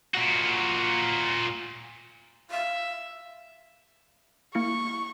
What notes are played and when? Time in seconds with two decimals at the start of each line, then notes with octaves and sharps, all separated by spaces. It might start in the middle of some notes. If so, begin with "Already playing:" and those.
0.14 A#2 F#4
2.51 E5 F5
4.55 A#3 E4 C#6 C#7